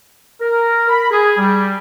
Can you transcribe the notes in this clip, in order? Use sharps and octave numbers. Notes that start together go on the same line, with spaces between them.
A#4
B5
G#4
G3